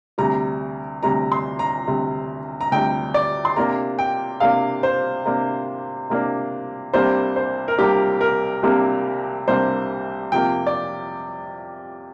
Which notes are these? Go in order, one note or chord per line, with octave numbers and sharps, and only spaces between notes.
D2 C3 G3 A#5
D2 C3 G3 A#5
C6
A#5
D2 C3 G3
A#5
D2 C3 G3 G5
D5
C6
C3 A#3 D4 A#5
G5
C3 A#3 D4 F5
C5
C3 A#3 D4
C3 A#3 D4
C2 C3 G3 A#3 D4 C5
C5
A#4
C2 C3 G3 A#3 D4 G4
A#4
C2 C3 G3 A#3 D4
C2 C3 G3 A#3 D4 C5
F2 C3 A#3 G5
D5